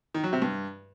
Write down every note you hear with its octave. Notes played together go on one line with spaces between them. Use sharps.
D#3
F#3
C3
G2